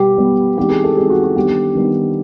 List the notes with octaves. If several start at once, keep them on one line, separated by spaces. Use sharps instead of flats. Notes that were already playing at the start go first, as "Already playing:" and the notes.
Already playing: B2 G3 B3 G4
B2 G3 B3
E3 G#3 C4 D#4 G4
G#4
A4
E3 G#3 C4 D#4 G#4
F#4
F#4
D#3 G3 B3 D4 G4
D#3 G3 B3 D4